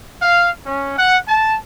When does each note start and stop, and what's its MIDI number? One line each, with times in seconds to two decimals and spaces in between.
0.22 0.50 77
0.66 0.96 61
0.97 1.18 78
1.28 1.57 81